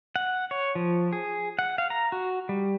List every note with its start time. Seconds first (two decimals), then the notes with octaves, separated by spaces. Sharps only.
0.16 F#5
0.51 C#5
0.75 F3
1.13 G#4
1.59 F#5
1.78 F5
1.90 A#5
2.12 F#4
2.49 G3